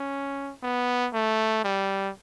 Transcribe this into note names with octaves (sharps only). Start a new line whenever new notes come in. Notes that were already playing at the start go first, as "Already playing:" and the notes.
Already playing: C#4
B3
A3
G3